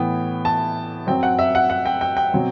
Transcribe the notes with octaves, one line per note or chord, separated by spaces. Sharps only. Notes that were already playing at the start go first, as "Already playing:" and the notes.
Already playing: A2 E3 B3 G5
A5
F#2 F#3 C4 G5
F#5
E5
F#5
F#5
G5
G5
G5
B2 F#3 C4